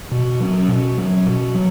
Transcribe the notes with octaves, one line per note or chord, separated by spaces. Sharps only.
B2
F#3 C#4
B2
F#3 C#4
B2
F#3